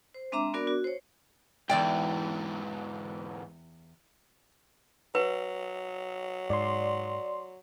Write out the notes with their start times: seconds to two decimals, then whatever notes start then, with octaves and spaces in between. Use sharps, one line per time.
0.14 C5
0.32 G#3 C4 D4 E5 A#5 D6
0.54 B3 D4 F#4 A#4 D5 D6
0.67 F#4
0.84 C5 C#5
1.69 E2 G#2 E3 D5 G5
5.15 F#3 B4
6.50 G#2 D5 C6